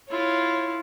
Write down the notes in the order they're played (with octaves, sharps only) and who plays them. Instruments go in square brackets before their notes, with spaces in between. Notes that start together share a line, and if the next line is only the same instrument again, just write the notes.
[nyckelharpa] E4 F4 [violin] C#5